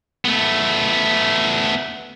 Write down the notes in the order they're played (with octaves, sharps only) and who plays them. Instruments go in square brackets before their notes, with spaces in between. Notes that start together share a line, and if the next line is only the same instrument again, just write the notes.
[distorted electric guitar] A3 B3